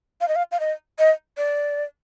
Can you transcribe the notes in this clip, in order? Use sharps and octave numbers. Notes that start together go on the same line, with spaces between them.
F5
D#5
F5
F5
D#5
D#5
D5